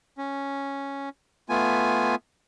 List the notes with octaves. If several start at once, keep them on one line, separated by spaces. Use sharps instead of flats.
C#4
A3 B3 F4 G#5